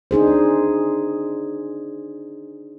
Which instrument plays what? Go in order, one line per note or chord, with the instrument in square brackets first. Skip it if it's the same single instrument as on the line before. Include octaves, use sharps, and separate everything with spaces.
[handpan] D4 D#4 G#4 C5